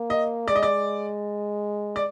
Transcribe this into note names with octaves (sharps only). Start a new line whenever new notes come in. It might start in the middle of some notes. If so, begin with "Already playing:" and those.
Already playing: A#3
D#5
G#3 D5
D#5
D5
D5